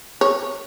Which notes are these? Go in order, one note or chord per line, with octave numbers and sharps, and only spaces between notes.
C#5